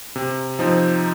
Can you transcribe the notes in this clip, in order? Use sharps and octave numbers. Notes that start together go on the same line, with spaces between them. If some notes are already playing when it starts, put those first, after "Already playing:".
C3
F3 C4 D#4